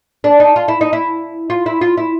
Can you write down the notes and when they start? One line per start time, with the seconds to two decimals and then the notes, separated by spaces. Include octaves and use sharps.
0.24 D4
0.40 D#4
0.56 F4
0.68 E4
0.81 D#4
0.93 E4
1.50 F4
1.66 E4
1.81 F4
1.97 E4